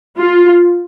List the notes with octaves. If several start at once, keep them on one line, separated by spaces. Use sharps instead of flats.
F4